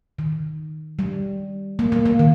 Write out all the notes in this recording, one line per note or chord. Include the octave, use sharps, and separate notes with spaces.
D#3
G3
A#3
A#3
A#3
D#3